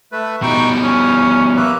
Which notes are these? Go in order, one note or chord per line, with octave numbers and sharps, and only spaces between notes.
A3 B4
B2 G3 D#4 G5 C#6
C#4 D#6
A#3 B4 E5